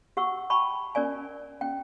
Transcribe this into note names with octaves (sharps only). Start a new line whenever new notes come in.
G4 F#5 C#6 E6
G5 A5 B5 C#6
C#4 A#4 D5 G#5
C#4 G5